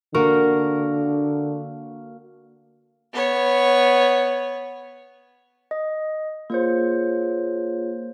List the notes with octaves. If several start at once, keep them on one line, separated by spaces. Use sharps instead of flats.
D3 A#3 F#4 A#4
B3 C#5
D#5
A#3 F4 G#4 C5 C#5